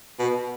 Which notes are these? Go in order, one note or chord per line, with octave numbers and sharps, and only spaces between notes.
B2